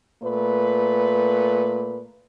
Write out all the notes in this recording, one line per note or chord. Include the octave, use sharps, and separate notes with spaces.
A#2 A3 B4